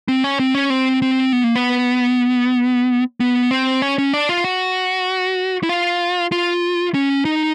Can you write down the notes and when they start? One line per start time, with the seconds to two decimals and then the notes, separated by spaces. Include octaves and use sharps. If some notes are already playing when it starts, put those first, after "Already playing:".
0.08 C4
0.24 C#4
0.39 C4
0.55 C#4
0.70 C4
1.02 C4
1.33 B3
1.44 A#3
1.56 B3
3.20 B3
3.51 C4
3.82 C#4
3.98 C#4
4.13 D4
4.29 F4
4.44 F#4
5.63 E4
5.69 F4
6.32 F4
6.94 C#4
7.25 D#4